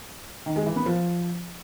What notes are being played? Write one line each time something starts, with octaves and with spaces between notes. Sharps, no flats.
D#3
G#3
E3
B3
F3